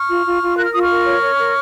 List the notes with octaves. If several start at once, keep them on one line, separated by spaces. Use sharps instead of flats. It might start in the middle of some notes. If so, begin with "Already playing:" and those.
Already playing: C#6 F6
F4
F4
F4
A#4 F#6
F6
F4 D#6
C#6 F6
A#4
C#5
C#5
A#4